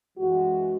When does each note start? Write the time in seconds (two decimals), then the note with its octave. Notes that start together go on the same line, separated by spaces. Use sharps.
0.17 F#2 E3 G#3 F#4